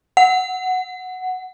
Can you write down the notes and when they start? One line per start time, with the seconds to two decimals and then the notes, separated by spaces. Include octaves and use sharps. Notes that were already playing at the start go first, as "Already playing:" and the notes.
0.17 F#5